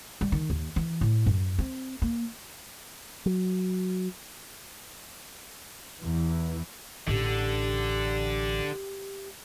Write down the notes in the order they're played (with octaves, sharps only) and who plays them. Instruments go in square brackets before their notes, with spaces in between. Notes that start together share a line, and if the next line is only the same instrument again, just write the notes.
[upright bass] G3
D#3
D#2
E3
A2
F#2
C4
A#3
[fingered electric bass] F#3
[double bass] E2 E3
[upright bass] A1 [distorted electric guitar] D3 [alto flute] G4